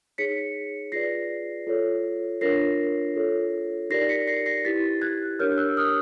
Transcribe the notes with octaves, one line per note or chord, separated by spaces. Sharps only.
D#4 G#4 C#5 B6 C#7
F4 G#4 B4 D5 A#6 C7
F4 A4 C#5
D4 F4 A#4 C#5 A#6 C7
F4 A4 C#5
D#4 G4 A#4 D5 A#6 C7
B6 C#7
A#6 C7
A#6 C7
E4 G4 B4 A6 B6
F#6 G#6
D4 G4 A#4 C#5 F6 G6
E6 F#6
D#6 F6